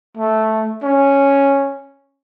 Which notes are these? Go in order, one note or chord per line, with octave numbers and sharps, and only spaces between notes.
A3
C#4